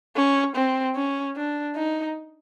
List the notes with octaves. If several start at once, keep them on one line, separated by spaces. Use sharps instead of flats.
C#4
C4
C#4
D4
D#4